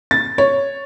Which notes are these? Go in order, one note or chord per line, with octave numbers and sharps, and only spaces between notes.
A6
C#5